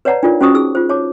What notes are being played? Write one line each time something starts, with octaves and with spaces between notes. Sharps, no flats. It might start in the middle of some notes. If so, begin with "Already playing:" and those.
B4 C#5 D5 F#5 A5 A#5
D4 D#4 F4 A#4 D5
C#4 F#4 C5 A5 C#6 D#6
D#4 G#4 E6
F4 C5
C#5 A5 D6